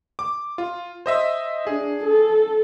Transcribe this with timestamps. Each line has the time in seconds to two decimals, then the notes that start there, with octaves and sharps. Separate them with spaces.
0.19 D6
0.58 F4
1.06 C5 D#5 E5
1.67 D4 G#4
2.04 A4